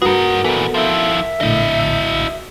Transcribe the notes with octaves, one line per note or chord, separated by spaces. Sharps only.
G2 F#4 G#4 A#4 B4 F#5
A#2 E3 B3 A4 B5
F3 E4 E5
A#1 A2 D3 E4 D#5